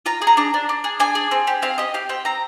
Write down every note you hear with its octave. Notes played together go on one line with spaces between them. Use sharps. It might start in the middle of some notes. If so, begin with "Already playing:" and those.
F4 A#5
G#4
A#5
D4 A#5
D4
D4
G#4
D4 G#5
G#4
C4
G4
C4 F5
G4 D#5
G4 F5
C4 G5
C4 A#5